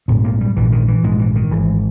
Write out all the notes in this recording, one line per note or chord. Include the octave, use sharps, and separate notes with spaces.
A#1 G#2 B3
A#3
G3
A#1 G#2 E3
D#3
E3
A#1 G#2 G#3
E3
D#3
G#1 G#2 E3